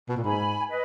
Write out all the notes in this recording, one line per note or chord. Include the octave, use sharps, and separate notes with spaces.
B2
A#2
G#2 G#5 B5
B4 D#5